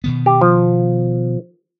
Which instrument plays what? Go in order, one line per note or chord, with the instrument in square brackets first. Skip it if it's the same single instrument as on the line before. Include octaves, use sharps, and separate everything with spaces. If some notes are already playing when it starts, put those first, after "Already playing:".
[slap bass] B2 D#3 B3
[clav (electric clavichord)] G4
F3